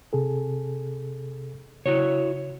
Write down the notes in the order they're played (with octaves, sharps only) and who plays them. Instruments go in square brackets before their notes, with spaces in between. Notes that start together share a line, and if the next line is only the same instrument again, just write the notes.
[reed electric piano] C3 G#4 A4
[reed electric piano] C#3 [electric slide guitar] E4 F#4 C#5